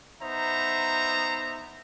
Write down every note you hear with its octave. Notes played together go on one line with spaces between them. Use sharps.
B3 D#4 C5 E5 A#5